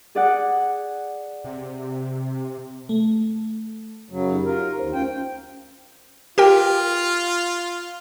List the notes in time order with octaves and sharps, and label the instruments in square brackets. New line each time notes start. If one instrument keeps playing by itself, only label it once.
[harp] G#4 D5 F#5
[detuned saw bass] C3
[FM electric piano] A3
[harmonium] F#2 C#3 F#3
[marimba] D#4 G4
[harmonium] F4 A#4
[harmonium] D#2 [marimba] C5
[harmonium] D2 F4 G5 [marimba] C#4
[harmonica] F4 [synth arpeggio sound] G4 A#4 G5